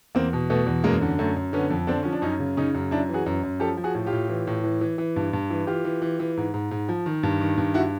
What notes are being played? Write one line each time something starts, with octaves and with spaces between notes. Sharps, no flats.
E2 A#3 C4
B2
B2 A3 B3
E2
F#2 G#3 A#3
D3
F#2 A3
F#2
D3 B3 C#4
F2
D3 C4 D4
F3 C#4
D4
F#2 C#4 D#4
C#3
C#3 C#4 D#4
F#2
F#2 D4 E4
E3
F#4 G#4
F#2
F#2
F3 G4 A4
F3
F#4 G#4
A2
F4 G4
A2
E3
A2
E3
E3
E3
G2
G2
E3
E3 F4 G4
E3
E3
E3
G#2
G#2
G#2
F3
D#3
G2
D#3
G2
E4 F#4